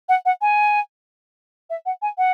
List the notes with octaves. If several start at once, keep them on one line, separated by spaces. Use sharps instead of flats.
F#5
F#5
G#5
E5
F#5
G#5
F#5